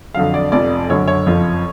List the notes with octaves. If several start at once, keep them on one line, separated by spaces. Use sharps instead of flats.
F2 D3 F#3 F5
D5
F1 F2 F3 D5
F#1 F#2 D3 F#3 C#5
C#5
F#1 F2 F3